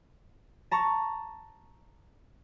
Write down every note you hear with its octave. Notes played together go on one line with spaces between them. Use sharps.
A5 A#5 C#6